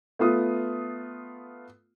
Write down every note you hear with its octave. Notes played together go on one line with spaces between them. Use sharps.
A3 B3 F4 D#6